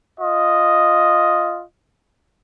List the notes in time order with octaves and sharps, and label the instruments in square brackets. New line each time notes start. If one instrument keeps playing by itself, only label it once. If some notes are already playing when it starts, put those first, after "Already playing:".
[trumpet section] F4 D#5